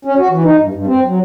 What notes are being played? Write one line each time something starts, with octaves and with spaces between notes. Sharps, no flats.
C#4
F#4
E3
D#4
G2
G2
C4
F#3